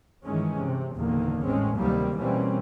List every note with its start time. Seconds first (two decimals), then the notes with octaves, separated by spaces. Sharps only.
0.25 G2 D#3 E3 G#3 C#4
0.63 C3
0.95 F#1 E2 A#2 D3 D#3 A#3
1.46 G#1 A2 G#3 C4 C#4
1.77 D2 C3 D#3 F#3 G3 A#3
2.17 B2 E3 G3 A#3 C4 C#4